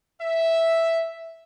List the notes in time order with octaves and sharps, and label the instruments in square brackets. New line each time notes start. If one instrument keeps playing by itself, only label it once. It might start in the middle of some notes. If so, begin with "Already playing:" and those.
[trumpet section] E5